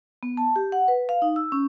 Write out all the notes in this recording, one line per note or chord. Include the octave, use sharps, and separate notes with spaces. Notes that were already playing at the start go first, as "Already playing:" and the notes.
B3
A5
G4
F#5
B4
F5
D#4
E6
C#4